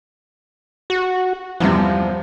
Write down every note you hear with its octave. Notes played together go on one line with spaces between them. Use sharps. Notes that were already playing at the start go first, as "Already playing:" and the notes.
F#4
E2 G2 C3 F3